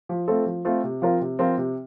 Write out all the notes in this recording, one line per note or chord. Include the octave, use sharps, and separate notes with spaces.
F3
A3 C4 F4 A4
F3
A3 C4 F4 A4
C3
F3 C4 F4 A#4
C3
F3 C4 F4 A#4
C3